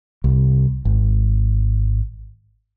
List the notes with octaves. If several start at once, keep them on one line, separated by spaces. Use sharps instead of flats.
C2
G#1